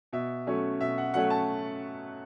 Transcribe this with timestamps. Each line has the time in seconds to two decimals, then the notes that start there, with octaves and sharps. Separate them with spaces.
0.13 B2 E5
0.47 F#3 A3 C#4
0.81 B2 E5
0.98 F#5
1.14 F#3 A3 C#4 F#5
1.30 A5